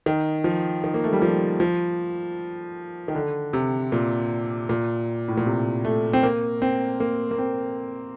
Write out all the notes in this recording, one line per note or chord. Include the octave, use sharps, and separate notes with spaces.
D#3
F3
D#3
A#3
A3
G3
F3
F3
D#3
D3
C3
A#2
A#2
A2
A#2
C3
A3
C4
A#3
C4
A#3
A#3
C4